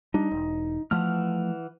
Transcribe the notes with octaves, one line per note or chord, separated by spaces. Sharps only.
G3 D4 D#4
E1
E3 F3 A3 F#5 F6